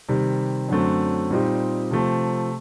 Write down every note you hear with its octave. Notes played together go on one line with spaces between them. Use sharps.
C3 D#3 G3
F#2 D3 F#3 A3 C4
A#2 G3 C4 D#4 G4
C3 F3 A3 C4